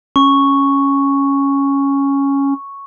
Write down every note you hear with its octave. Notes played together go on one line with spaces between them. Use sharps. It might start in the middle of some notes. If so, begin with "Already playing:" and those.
C#4 C#6